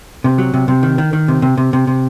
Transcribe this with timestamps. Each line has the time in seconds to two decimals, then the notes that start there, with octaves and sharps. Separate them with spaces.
0.24 C3
0.38 F#3
0.54 C3
0.68 C3
0.83 D#3
0.98 D#3
1.13 D#3
1.28 C3
1.42 C3
1.58 C3
1.73 C3
1.87 C3